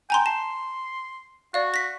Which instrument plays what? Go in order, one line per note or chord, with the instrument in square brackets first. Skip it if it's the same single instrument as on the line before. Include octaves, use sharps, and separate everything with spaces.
[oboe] G5 [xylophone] G#5 A#5 C6
[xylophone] A5 [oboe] C6
[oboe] F#4 [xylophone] D5 F5
[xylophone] A#6 B6